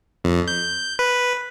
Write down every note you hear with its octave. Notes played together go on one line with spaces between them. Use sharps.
F2
G6
B4